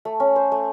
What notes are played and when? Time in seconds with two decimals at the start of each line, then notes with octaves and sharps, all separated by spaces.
0.05 A3
0.20 C#4
0.36 C5
0.52 A3